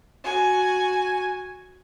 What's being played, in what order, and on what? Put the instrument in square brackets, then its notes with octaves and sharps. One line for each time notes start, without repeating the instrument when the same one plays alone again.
[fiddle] F#4 G#5